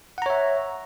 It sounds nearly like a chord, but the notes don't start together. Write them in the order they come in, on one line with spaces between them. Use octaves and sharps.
F#5 A#5 C#5 E5